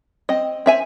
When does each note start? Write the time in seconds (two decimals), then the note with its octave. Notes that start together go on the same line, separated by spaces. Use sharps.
0.29 C4 D#5
0.66 C4 E5 G#5